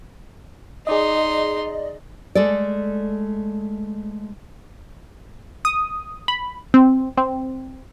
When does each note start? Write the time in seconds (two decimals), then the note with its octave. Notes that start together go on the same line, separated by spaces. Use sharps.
0.87 D#4 G#4 D5 D#5 C6
2.35 G#3 A3 A4 D5
5.65 D#6
6.28 B5
6.74 C4
7.17 C4